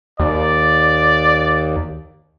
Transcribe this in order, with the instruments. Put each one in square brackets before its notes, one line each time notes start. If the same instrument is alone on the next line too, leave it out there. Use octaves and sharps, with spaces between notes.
[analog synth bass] D#2 [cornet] D5